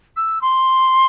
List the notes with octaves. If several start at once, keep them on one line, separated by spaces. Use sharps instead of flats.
E6
C6